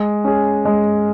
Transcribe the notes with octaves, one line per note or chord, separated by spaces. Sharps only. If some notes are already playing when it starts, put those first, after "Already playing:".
Already playing: G#3
C#4 G#4
G#3